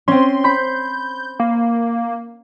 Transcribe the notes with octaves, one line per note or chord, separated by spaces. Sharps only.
C4 C#4 C6
B5 C6 G6
A#3